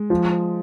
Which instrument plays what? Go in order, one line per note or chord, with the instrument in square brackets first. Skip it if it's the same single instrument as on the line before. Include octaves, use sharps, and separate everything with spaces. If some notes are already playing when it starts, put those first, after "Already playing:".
Already playing: [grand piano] G#3
[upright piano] F3